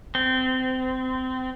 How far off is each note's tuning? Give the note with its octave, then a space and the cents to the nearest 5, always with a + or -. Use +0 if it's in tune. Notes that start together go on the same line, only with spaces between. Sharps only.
C4 -25